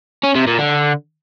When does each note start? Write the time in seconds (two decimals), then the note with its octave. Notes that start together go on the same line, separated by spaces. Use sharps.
0.24 C#4
0.35 C3
0.47 A#2
0.59 D3